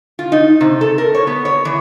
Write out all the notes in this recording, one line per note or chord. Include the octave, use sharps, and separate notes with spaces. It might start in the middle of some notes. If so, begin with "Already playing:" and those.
F4
D#4
C3
A4
A#4
C#5
B3
C#5
E3